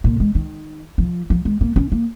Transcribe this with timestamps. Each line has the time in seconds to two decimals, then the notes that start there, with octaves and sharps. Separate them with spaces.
0.04 A#2
0.20 G#3
0.35 D#3
0.98 F3
1.30 F3
1.45 G#3
1.61 A#3
1.76 C#4
1.92 A#3